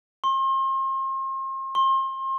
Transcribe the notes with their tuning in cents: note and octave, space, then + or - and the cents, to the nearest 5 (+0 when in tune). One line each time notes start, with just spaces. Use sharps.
C6 +40
C6 +35